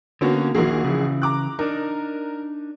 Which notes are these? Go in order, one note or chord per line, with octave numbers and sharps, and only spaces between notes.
D3 A#3 B3 C#4 F#4
A#1 D#2 D#3 A#3 F#4 G#4
C#3 E3
A#5 D6 F#6
D4 D#4 A#4